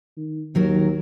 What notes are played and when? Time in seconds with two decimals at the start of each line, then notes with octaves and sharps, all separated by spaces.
0.17 D#3
0.55 D#2 D#3 F#3 A#4